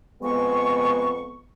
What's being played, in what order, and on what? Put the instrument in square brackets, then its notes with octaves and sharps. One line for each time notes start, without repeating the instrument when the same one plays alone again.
[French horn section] F2 G#3 B3 [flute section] C#6